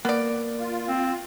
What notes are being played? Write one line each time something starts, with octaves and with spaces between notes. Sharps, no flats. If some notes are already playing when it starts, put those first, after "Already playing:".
A#3 B3 D5
F4
C4